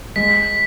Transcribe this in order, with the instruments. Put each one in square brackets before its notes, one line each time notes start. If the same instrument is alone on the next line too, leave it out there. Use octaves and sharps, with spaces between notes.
[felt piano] G#3 [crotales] B6